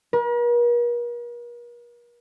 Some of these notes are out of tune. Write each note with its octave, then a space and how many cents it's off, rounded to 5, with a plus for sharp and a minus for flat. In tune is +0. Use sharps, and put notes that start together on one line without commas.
A#4 +45